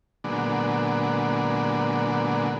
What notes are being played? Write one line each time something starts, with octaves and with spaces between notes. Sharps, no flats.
A#2 D3 F#3 G#3 B3 D4